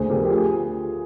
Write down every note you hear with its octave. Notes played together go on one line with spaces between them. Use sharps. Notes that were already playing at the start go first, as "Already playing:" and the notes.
Already playing: D2 G#4 C5
D3 F3 G4 A#4
G4
F4 G#4